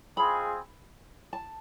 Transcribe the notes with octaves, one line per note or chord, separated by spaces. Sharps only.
G#3 C4 F4 G#4 B5
A5